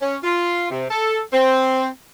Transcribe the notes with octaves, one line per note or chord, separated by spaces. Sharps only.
C#4
F4
C3
A4
C4